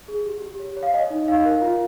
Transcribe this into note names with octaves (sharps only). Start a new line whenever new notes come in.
G#4
G4
G4
C#5
C#5
F5
C#5 D#5
D#4
D#4 F5
A#4
F4